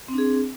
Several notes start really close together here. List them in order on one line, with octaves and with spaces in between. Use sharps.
C4 D4 G#4